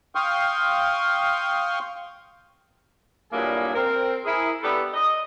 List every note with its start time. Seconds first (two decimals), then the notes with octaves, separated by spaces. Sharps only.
0.15 F5 G5 C6 C#6 D#6 F6
3.32 G2 A#2 F#3 A#3 E4 G#4
3.75 C4 A#4
4.25 E4 G#4 A#4
4.63 B3 D4 G4 A4 B4
4.93 D#5